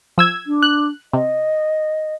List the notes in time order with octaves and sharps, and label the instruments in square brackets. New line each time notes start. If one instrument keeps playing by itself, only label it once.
[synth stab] F3 E6 G#6
[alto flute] D4
[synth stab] F#6
[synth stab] C3 [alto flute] D#5